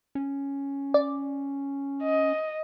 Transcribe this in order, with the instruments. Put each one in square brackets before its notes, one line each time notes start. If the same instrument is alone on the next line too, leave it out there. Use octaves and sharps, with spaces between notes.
[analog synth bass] C#4
[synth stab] D5
[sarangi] D#5